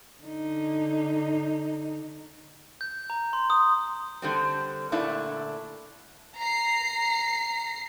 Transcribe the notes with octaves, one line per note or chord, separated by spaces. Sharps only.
D3 D#4
G6
A#5
C6
D#6
D3 G3 C4
A#2 D3 A3 D4 E4
A#5 C7